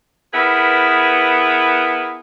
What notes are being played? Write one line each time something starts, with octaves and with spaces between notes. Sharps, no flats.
B3 E4 G#4 A#4 B4